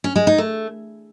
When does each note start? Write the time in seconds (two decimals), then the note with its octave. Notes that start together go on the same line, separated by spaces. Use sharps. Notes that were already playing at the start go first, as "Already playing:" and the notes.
0.04 C#4
0.16 G#3
0.27 D#4
0.38 A3